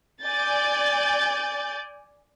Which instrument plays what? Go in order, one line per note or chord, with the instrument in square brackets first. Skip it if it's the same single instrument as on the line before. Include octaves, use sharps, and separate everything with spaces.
[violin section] D5 G#5 G6 A6